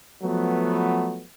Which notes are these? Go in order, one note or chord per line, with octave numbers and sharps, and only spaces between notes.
F3 F#3 A3 B3